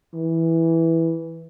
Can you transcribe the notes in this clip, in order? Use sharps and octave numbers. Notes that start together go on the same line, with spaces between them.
E3